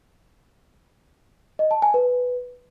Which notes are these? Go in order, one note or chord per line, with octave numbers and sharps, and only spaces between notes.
D#5
A5
G#5
B4